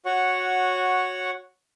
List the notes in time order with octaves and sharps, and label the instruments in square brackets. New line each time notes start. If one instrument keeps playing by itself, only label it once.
[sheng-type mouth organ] F#4 C#5 F#5 C#6